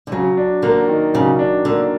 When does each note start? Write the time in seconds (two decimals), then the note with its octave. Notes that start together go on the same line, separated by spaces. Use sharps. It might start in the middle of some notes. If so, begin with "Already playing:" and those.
0.07 D3
0.12 C#3 F#3
0.37 D4
0.62 D3 A#3
0.88 D#3
1.14 C#3 F#3
1.39 D4
1.65 D3 A#3